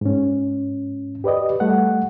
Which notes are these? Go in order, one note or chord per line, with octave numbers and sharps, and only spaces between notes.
G#2 C#4
G4 B4 D5 D#5
G3 A3 F#5